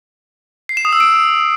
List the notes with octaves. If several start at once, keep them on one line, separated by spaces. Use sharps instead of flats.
C7
E7
D#6
E6
D7